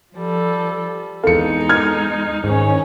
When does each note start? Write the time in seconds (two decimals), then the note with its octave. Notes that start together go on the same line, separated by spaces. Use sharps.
0.15 F3 G3 A4
1.24 E2 G#3 D#4 A4 F5 C#7
1.69 F6 G#6
2.44 G#2 D#3 C#4 C#5